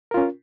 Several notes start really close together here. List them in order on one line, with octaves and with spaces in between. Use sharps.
A#4 F4 C#4